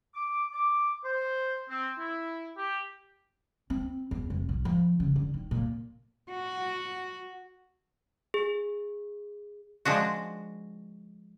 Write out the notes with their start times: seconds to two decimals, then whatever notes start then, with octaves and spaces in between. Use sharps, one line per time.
0.15 D6
0.52 D6
1.04 C5
1.70 C4
1.99 E4
2.57 G4
3.70 C4
4.11 E2
4.30 F1
4.49 B1
4.65 F3
5.00 C#3
5.16 D3
5.34 D#3
5.51 A#2
6.31 F#4
8.34 G#4
9.85 F3 G#3 D4 F#4